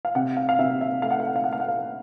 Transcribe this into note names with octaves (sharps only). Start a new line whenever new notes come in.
F5
C3 F#5
F5
F5
C3 E5
E5
A3 F5
F#5
F5
F#5
F5
A3 F#5
F5
F#5
F5